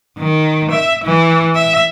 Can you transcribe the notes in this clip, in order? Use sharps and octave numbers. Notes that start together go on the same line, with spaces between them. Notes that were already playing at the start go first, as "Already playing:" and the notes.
D#3
E5
E3
E5